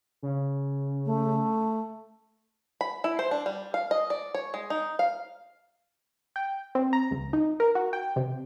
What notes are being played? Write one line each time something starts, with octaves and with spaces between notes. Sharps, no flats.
C#3
A3
B5
E4
C5
D4
G3
F5
D#5
D5
C#5
G#3
D#4
F5
G5
C4
A#5
C#2
D#4
A#4
F#4
G5
C3